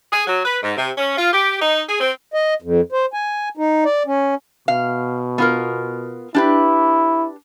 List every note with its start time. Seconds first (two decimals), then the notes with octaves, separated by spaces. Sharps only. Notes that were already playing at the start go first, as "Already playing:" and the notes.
0.13 G#4
0.27 F#3
0.45 B4
0.63 G#2
0.77 C3
0.98 C#4
1.18 F4
1.33 G4
1.62 D#4
1.88 G#4
2.00 C4
2.34 D#5
2.62 F2
2.92 C5
3.13 G#5
3.57 D#4
3.85 D5
4.07 C#4
4.68 B2 F5
5.38 B3 F4 A#4
6.35 D4 E4 G4 B4